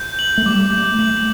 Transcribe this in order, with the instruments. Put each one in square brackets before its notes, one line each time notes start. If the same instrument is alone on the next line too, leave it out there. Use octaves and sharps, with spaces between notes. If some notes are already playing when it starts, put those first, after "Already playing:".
Already playing: [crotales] G6
F#7
[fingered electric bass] A3
[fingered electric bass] G3 [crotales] D6
[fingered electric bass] A3 [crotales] G6
[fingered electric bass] A3 [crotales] F#7